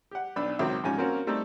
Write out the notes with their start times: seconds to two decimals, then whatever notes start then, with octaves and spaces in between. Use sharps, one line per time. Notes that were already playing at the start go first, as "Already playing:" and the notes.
0.11 G4 F#5
0.36 B1 D4 B5 E6
0.59 C#2 D#3 F#3 C4
0.84 G#2 F3 C#4 G4 G#5
0.98 A#3 C4 C#4 F#4 A#4
1.27 G3 A3 C4 D#4 A4